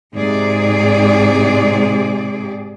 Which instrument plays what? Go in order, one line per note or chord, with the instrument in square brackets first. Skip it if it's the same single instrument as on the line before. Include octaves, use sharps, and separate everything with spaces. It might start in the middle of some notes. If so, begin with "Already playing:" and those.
[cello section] G#2 C3 G#4 D5